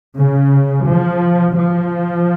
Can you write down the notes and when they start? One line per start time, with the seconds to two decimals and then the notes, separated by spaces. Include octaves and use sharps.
0.17 C#3
0.87 F3
1.56 F3